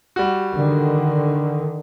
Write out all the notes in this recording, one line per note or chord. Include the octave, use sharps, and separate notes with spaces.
G3 F#4
D3 D#3